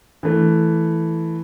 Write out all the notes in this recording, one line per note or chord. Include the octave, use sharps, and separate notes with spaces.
E3 A3